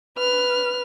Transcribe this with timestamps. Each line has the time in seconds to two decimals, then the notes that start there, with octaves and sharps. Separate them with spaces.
0.18 B4 F6